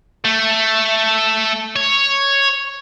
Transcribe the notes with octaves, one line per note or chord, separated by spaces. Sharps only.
A3
C#5